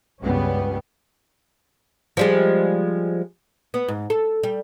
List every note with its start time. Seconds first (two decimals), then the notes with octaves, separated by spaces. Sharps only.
0.23 C#2 G2 C#3 G3 B3 C#4
2.17 F3 G3 G#3
3.74 B3
3.88 G#2
4.10 A4
4.43 G3